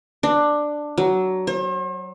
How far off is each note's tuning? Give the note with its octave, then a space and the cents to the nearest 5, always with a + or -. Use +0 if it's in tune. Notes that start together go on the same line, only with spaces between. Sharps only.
D4 +10
F#3 +15
C5 +45